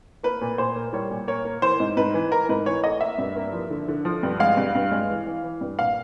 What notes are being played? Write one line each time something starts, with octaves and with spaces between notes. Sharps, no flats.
A#3 B4
A#2
A#2 C5
A#3
G3 C#5
A#2
A#3 C#5
A#3
E3 C5
G#2
G#2 B4
E3
E3 A#4
G#2 B4
E3 C#5
A3 D#5
A#3 E5
G2
A#3
F3
D3
D3
F3
G2
G#3 F5
G2
G2
G#3
E3
E3
E3
G2
A#2 F5